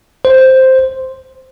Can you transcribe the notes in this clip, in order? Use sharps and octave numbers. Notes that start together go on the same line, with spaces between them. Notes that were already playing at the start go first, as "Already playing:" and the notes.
C5